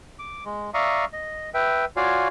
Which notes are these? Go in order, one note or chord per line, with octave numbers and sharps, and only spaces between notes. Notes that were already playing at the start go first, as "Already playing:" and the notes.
D6
G#3
D5 E5 F5 A#5 C#6 D#6
D#5
B4 E5 G5
F4 F#4 C#5 D5 F5 G#5